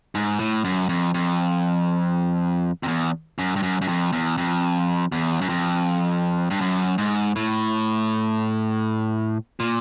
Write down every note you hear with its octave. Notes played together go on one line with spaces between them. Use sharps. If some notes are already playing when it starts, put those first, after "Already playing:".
G#2
A2
F#2
F2
F2
F2
E2
F#2
G2
F#2
F#2
F2
E2
F2
E2
F#2
F2
G2
F#2
G#2
A2
A#2